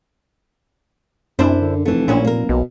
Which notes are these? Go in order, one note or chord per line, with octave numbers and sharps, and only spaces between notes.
F#2 C3 D4 E4 C5
D3
F1 E3 A3
A#1 A#2 A#3 C#4 E4
F1 A#3 A#4
B1 B2